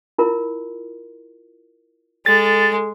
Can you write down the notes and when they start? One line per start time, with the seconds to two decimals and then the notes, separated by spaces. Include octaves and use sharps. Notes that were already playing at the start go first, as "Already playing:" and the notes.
0.18 E4 F4 A#4
2.26 G#3 A4 A6